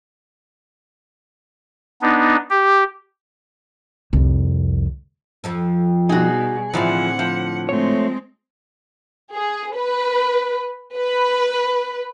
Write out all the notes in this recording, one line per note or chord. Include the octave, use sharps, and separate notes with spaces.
B3 D4 D#4
G4
C2 F2
F2 F3 A4
B2 G3 D#4 F#4 G#4
A2 D3 E3 F3 C4 D#4 F#5
F3
G#3 A3 C4 C#5
G#4
B4
B4